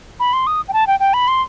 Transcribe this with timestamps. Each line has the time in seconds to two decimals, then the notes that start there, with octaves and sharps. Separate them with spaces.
0.20 B5
0.33 C6
0.47 D#6
0.68 G5
0.73 A5
0.87 G5
1.00 G5
1.13 B5
1.28 C6